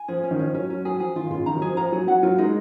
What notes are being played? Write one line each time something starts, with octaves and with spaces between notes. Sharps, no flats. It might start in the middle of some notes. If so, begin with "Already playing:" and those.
Already playing: G#5
F3 G#4
C#4
D#3
F3 C#4
F#3 C#4
F#3 C#4
F#3 G#4
F3 G#4
D#3 F4
C#3 F4
D#3 A#5
F#3
F3 G#4
F3 A#5
F#3 G#4
F#3 F#5
F#3 F4
G#3 D#4